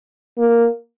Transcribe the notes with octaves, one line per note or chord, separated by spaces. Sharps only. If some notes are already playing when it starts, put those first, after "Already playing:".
A#3